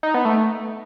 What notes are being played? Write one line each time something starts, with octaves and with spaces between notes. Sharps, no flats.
D#4
B3
A3